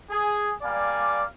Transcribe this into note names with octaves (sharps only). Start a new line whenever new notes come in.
G#4
G3 A#3 D5 F5 G#5 D6